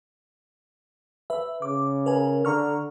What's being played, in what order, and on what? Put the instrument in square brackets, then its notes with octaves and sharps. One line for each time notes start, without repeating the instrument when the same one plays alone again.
[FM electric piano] B4 E5
[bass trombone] C#3 [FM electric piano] D6
[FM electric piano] A#4 B4 G#5
[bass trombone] D3 [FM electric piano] A#5 C#6 F6